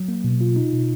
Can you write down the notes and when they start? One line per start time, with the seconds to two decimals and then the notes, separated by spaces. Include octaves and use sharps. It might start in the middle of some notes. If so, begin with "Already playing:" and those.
Already playing: F#3
0.08 A#3
0.24 B2
0.41 F4
0.56 D#4
0.73 B2